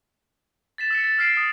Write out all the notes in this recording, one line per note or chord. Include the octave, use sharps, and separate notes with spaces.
A6 B6 E7
E6 B6 C#7
A6
E6 F6 B6 C7 D7 E7
D#6